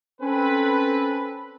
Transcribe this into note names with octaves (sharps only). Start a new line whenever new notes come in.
C4 C#4 A4 B4